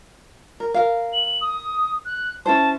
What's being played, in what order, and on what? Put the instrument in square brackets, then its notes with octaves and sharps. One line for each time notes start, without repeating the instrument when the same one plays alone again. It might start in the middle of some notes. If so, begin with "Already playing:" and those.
[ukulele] A#4
A#4 F5
[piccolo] F#7
D#6
F#6
[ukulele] C#4 E4 C5 [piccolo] A5